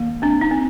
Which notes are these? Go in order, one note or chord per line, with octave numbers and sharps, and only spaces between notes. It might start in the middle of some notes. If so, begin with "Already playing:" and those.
Already playing: D#3 A#3
C4 D4
D#4
C4